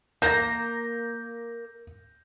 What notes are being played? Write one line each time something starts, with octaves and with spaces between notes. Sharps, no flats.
A#3 A#5 G6 A#6